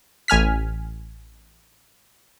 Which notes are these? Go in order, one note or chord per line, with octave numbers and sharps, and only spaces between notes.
A1 G#5 F6 B6